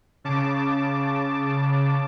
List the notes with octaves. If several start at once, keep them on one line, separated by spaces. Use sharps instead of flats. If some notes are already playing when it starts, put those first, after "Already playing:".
C#3 A5 D6